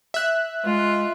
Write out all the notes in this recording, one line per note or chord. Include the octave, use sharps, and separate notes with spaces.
E5 F#6
G#3 F4